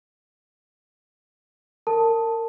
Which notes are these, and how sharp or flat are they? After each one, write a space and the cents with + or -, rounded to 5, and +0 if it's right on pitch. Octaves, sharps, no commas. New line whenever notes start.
A#4 -25 A5 +5